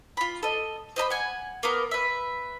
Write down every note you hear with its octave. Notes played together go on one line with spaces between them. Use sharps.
F4 B5
A4 D#5
C5 D#5 A#5 B5
F#5 G#5
A#3 B3 A#4
B4 E5